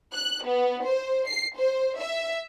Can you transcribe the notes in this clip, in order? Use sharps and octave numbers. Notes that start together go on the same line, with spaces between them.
F#6
B3
C5
C7
C5
E5